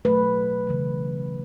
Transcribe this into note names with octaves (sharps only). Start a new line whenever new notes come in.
B2 F#3 A3 B4
C#3 E3 A3